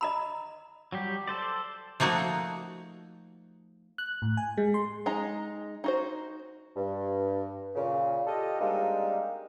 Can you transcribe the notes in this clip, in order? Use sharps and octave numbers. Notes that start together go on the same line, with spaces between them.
D#5 A#5 B5
F#3 G3 G4
A4 C5 D5
F3 A3 A#3 D#4 F#4
F#6
A2
G#5
G#3
C6
G#3 D#4 A#5
D#4 F#4 C5
G2
A#2 C#3
F4 G4 A4 D#5
G3 G#3 A#3 C4 D4 D#4